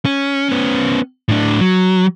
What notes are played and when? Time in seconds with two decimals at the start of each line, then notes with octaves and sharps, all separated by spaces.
0.05 C#4
0.49 B3 C#4
1.29 A2 D4
1.61 F#3